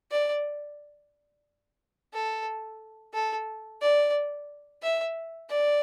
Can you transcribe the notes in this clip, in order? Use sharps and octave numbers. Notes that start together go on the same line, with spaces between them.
D5
A4
A4
D5
E5
D5